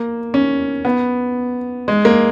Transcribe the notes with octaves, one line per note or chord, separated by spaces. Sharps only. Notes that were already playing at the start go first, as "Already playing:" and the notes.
Already playing: A#3
C#4
B3
G#3
A#3